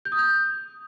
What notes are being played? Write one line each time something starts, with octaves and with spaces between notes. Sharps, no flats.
G6
D#6
G6